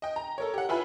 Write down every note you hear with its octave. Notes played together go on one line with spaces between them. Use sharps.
D#5 G5
A#5
A4 A#4 C#5
G4 F#5
E4 F4 B4 G#5 B5